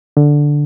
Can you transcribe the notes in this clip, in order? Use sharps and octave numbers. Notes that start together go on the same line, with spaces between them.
D3